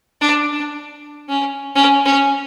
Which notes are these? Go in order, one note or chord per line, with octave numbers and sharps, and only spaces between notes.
D4
D4
C#4
C#4
C#4